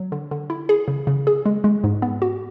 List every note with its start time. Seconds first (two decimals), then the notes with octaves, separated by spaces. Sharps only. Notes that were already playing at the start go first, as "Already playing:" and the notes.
Already playing: F#3
0.12 D3
0.31 D3
0.50 E4
0.69 G#4
0.88 C#3
1.07 C#3
1.27 G#4
1.46 G#3
1.64 G#3
1.84 G#2
2.02 B3
2.22 F#4